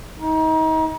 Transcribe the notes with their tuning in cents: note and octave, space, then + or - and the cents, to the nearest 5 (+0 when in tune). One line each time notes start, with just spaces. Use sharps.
D#4 +30